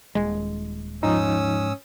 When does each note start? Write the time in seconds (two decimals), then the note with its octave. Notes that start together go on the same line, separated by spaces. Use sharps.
0.15 D#1 G#3
1.03 G#2 F3 C#4 D#4 D#6 E6